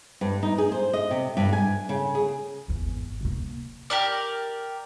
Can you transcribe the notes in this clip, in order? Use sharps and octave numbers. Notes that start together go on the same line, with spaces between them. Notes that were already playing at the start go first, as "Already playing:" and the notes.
G2
D#4
G#4
C5
D#5
C3
G2
G#5
C#3
G#4
G#1 E2
C3 A#3
G4 A#4 D5